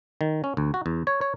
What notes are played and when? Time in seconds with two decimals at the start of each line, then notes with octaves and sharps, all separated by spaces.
0.21 D#3
0.44 C#4
0.57 D2
0.74 F#4
0.86 E2
1.07 C#5
1.21 C#5